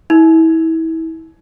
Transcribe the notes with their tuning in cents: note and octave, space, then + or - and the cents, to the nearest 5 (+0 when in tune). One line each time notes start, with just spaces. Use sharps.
E4 -30